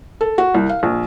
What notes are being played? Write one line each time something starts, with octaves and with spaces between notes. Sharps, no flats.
A4
F#4
C2
F5
A#1